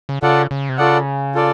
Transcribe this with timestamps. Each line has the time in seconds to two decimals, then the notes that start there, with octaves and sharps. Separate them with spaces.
0.09 C#3
0.23 C#3 F4 A4 D5 F#5
0.51 C#3
0.69 C3
0.78 C#3 F4 A4 D5 F#5
1.35 F4 A4 D5